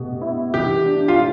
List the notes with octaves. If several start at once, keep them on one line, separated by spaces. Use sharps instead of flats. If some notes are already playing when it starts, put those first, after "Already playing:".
Already playing: B2 A3 G4
E4
E3 G4
D4
F4
A2